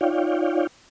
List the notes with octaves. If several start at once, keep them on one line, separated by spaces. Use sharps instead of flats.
D#4 F4 C#5 D5 F5 G5